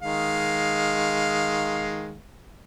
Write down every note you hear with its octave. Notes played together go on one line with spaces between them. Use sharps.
D#3 G#3 F5